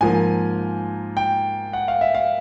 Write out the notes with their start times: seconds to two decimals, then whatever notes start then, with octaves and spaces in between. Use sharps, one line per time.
0.01 G#2 F3 A#3 G#5
1.17 G5
1.73 F#5
1.88 F5
2.01 E5
2.15 F5